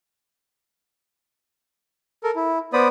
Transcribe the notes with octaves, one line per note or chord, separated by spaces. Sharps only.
A4 A#4
E4
B3 C5 D5 B5 D#6